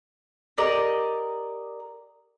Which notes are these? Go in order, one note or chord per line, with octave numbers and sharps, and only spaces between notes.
G4 A#4 D5 D#5